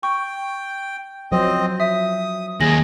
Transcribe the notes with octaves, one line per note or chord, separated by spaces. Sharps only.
G5 C#6
F3 F#3 C4 C5 D#5
E5 D#6
D#2 G#4 A#6 F#7